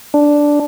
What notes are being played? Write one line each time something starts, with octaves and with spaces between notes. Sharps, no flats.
D4